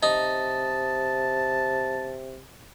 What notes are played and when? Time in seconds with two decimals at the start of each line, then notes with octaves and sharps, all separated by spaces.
0.03 C3 D#4 A5